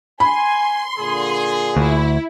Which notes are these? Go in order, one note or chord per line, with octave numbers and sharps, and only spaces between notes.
G#5 B5 C6
A#2 D3 G#4
D2 E4